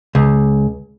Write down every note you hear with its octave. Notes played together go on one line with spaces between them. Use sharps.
C#2